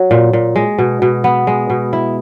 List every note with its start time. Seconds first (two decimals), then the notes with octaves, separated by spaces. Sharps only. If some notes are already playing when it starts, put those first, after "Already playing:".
Already playing: F#3
0.11 A#2
0.33 A#2
0.56 G#3
0.78 B2
1.02 B2
1.24 B3
1.47 G#3
1.70 B2
1.93 E4